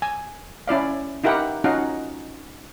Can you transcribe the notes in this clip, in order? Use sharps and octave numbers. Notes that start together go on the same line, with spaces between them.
G#5
C#4 E4 D5 F5
D#4 E4 G4 A#4 F#5 G5
C#4 D#4 F4 F#4 F5 F#5